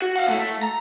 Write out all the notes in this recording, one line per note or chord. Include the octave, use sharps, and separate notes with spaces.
F#4
F5 F#5
A#2 A3
A3
A#5